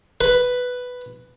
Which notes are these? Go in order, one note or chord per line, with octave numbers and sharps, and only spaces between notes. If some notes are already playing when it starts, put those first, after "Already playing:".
B4